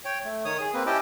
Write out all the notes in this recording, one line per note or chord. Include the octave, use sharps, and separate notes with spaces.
C#5 G5
A3
D#3 C#5 D#6
G#4
A#3 C4 B4
C#4 E4 G4 D#5 G5 A5